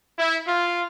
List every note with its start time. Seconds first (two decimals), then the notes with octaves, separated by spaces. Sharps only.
0.17 E4
0.46 F4